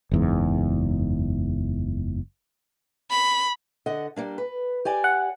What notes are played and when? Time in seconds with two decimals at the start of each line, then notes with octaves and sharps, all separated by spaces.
0.12 F#1 E2 G#2
3.11 B5
3.86 D3 D#5 F#5
4.16 G3 A#3 D4
4.38 B4
4.85 G4 D5 G#5
5.04 F#5